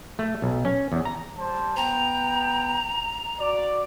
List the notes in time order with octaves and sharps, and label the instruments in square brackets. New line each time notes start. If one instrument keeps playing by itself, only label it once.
[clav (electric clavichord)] A3
B1
C#4
E2
A#5
[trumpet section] G3 C5 A5
[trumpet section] B3 G5 [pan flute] A#5
[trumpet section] F#4 D5